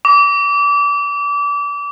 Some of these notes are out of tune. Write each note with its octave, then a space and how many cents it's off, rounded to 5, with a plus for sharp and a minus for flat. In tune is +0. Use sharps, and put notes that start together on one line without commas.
D6 -30